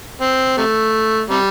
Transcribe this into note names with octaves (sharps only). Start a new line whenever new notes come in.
C4
C3 A3
C3 G3